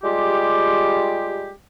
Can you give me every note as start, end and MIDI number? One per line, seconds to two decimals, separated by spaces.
0.03 1.50 55
0.03 1.50 56
0.03 1.50 65
0.03 1.50 67